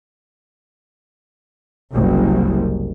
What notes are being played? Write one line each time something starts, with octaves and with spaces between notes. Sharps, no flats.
F#1 C2